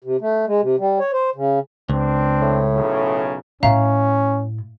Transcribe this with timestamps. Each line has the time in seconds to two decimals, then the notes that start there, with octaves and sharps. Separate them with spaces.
0.04 C3
0.21 A3
0.46 G#3
0.62 C3
0.79 G3
0.99 C#5
1.13 C5
1.35 C#3
1.90 C#2 C4 D4
2.42 A2
2.74 B1 C#3
3.63 A2 C#4 E5 F5 A#5